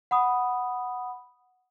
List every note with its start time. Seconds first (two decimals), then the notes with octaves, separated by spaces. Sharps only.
0.11 F#5 B5 D#6